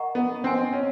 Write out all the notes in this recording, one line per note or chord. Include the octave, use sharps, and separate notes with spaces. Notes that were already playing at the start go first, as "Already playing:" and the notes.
Already playing: A#4 D#5 F#5 A#5 C#6
B3
C4 C5 D#5 G#5 C6
C#4